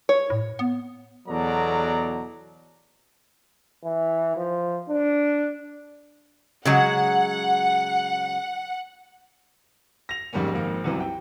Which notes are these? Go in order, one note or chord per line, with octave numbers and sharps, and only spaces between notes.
C#5
A2
B3
E2 B2 F#3 A4 D5 A#5
E3
F3
D4
C#3 F#3 G#3 F#5
A#6 F7
F2 G#2 G3 A#3 C#4
G#1 F2 A#3
C2 F#2 C3 E3
G5